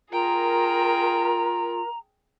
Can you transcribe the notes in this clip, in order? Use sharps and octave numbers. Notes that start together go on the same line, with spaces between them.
F4 G#4 A#4 G5 A#5